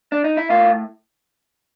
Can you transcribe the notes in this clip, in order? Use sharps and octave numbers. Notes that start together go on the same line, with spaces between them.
D4
D#4
E4
A2 F4